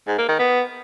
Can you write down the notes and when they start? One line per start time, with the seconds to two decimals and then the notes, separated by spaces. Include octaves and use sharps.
0.07 G#2
0.18 A#3
0.28 D#3
0.39 B3